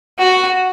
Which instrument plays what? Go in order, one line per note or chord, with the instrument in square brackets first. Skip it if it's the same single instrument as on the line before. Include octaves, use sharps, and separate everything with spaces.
[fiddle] F#4